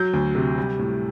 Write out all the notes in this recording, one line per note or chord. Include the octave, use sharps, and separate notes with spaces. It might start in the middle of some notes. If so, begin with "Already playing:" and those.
Already playing: F#3 G6
D2
C3
G3
A2